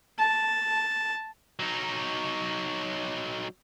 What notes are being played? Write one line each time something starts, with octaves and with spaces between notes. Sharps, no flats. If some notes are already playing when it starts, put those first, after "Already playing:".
A5
F#3 D#4